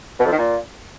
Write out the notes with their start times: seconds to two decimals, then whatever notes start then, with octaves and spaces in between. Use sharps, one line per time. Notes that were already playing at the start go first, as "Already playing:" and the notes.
0.19 B2
0.26 F2
0.32 D#3
0.38 A#2